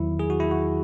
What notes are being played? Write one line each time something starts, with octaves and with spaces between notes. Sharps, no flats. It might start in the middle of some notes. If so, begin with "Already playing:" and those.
Already playing: E2 D#3 F#3 E4
G#4
F#4
E4
F#4